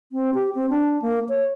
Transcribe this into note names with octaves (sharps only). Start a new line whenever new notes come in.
C4
G4
C4
D4
A#3
C#5